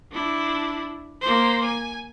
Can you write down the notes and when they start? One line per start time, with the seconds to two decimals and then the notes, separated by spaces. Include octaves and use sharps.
0.12 D4 E4
1.22 A#3 C5
1.63 G#5